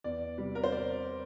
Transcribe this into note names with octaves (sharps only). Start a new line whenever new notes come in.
E2 D5
C3 G3
A#4
C5
D5